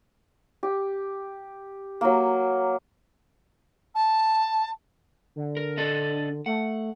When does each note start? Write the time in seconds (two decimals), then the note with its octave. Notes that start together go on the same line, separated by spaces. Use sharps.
0.63 G4
2.01 F#3 A#3
3.95 A5
5.36 D3
5.57 A#4
5.78 D4 A4 D#5
6.46 A3 F#5